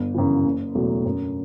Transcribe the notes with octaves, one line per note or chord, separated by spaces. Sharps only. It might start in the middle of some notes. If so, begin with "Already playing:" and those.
Already playing: G1
F#2 C#3 E3
F#1
E2 B2 F#3 A3
F#2